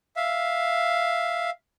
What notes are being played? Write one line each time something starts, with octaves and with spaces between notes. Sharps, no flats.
E5 F5